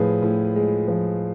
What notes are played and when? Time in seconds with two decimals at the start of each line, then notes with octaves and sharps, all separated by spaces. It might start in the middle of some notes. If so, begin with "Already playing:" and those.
Already playing: A2 F3 G#4 B4
0.22 A2
0.56 G#3
0.88 F3